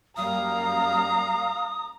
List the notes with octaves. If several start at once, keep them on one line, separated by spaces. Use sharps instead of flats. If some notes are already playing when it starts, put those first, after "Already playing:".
F#2 G3 A#3 F5 A#5 D#6